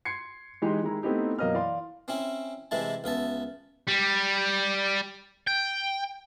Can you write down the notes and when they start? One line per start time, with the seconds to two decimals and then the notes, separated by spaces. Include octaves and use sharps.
0.05 C6 G#6 C7 C#7
0.62 E3 G#3 D#4 G4 C6
0.83 D#3 G#3 E4 A#5
1.03 A3 B3 C4 D#4 E4 G4
1.39 F#2 B2 A#3 D#5 F5 F6
1.54 E3 D5 F5 C6
2.08 C4 C#4 E4
2.71 C3 E3 G#3 E4 A5
3.04 C#2 B3 E5 A5
3.88 G3
5.47 G5